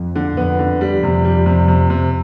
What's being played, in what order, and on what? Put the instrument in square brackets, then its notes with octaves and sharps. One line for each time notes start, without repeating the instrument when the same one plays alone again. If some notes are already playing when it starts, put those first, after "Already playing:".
Already playing: [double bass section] F2
[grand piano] D3
[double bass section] F2 [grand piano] B3
[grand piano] D3
G3
[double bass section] F2 [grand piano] C3
[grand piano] G3
C3
C3
C3